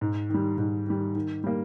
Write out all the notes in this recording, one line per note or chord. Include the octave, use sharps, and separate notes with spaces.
G#2
D#3 G3
G#2
D#3 G3
D#3
G3 A#3